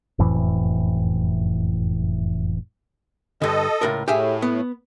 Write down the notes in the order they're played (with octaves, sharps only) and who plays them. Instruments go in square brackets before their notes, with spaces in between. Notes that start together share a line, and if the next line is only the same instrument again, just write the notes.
[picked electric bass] F#1 F2 A2 E3
[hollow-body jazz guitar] G2 D3 [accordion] A4 D#5
[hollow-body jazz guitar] C#2 A2 A#4
[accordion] A2 [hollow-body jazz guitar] G4 G#4 E5
[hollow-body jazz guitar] B3